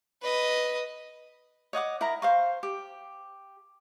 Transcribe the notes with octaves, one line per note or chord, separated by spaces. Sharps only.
B4 D#5
C#5 D#5 F#5 D6
E4 A#4 A#5
C5 F5 C#6
G4